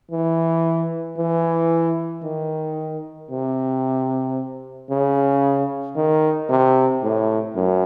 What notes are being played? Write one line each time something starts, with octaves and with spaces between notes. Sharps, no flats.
E3
E3
D#3
C3
C#3
D#3
C3
A2
F#2